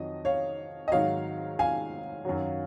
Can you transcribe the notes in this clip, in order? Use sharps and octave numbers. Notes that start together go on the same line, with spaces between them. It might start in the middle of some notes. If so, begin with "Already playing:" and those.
Already playing: F2 D#3 F#3 D#5
C#5 F5
D#5
G#2 D#3 F#3 C#5 F5
F5 G#5
F#2 D#3 F#3